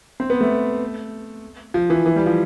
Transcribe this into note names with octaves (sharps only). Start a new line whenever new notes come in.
C4
B3
A3
F3
E3
E3
G3
F3